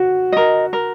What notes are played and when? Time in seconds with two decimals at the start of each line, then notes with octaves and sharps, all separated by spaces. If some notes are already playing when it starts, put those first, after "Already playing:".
Already playing: F#4
0.32 A#4 D#5
0.73 A#4